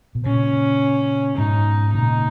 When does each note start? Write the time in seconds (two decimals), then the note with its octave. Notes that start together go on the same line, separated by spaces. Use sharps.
0.15 B2
0.25 A#2 C#3 C#4
1.37 G#2 B2 D#4
1.94 A#2 C#3 D#4